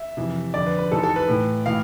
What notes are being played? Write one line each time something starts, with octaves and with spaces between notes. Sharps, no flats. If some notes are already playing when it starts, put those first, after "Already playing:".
Already playing: E5
F2 C3 E3
F2 D3 D5
B4
B4
G#2 E3 A4
A4
B4
A2 E3
A2 E3 F5